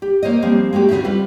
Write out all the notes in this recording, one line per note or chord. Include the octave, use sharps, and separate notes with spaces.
G4
A#3 C5 C#5 D#5
F3 G3 A#3 C4
G#3 A#3 F#4 G4
D2 C#3 F3 C4 F#4 E5
G3 C4 F4 B4